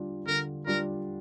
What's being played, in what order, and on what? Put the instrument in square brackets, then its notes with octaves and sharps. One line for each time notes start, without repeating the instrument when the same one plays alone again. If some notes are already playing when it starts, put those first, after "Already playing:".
Already playing: [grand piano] D3 G3 D4 F4
[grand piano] D3 [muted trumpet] A#4
[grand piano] G3 D4 F4 [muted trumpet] A#4